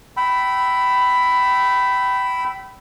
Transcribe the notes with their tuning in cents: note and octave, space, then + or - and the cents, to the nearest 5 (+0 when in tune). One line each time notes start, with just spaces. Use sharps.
G5 -25 B5 +5 E6 +0